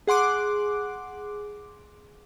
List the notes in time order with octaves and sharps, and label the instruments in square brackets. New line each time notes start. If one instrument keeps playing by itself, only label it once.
[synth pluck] G#4 F#5 C6 D6 F#6